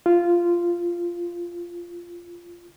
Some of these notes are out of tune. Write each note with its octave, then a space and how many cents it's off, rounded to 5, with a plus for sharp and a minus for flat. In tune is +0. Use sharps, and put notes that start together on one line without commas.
F4 -10